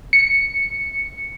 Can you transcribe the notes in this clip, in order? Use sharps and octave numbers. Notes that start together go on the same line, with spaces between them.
C#7